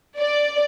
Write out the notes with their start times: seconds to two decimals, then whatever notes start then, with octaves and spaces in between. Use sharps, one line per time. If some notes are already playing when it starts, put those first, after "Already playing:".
0.17 D5